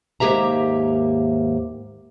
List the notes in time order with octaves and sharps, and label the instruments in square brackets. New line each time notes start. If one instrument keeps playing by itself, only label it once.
[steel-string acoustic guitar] D#2 G#2 A#3 G4 E5 A#5